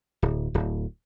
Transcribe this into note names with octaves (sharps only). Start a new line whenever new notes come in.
D1
D1